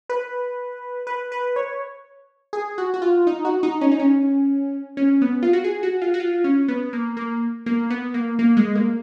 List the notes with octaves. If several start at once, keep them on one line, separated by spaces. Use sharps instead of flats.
B4
B4
B4
C#5
G#4
F#4
F#4
F4
D#4
F#4
D#4
C#4
D#4
C#4
C#4
B3
F4
F#4
G#4
F#4
F4
F#4
F4
C#4
B3
A#3
A#3
A#3
B3
A#3
A#3
G#3
A#3